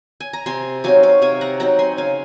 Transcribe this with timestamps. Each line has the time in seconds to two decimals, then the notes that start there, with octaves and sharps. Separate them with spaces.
0.20 G#5
0.33 A#5
0.46 C3 G#5 C6
0.84 F#3 C4 D#4 F5 G#5
1.03 C#5 F5
1.22 C3 F5 G#5
1.41 F#5 A#5
1.60 F#3 C4 D#4 F#5 A#5
1.79 G#5 C6
1.98 C#3 F5 G#5